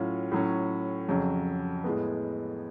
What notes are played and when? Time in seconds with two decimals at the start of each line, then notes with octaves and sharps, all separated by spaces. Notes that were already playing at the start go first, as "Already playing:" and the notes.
Already playing: A2 F#3 C#4 F4
0.32 A2 F#3 C#4
1.08 F2 C#3 F#3
1.84 A2 G#3 B3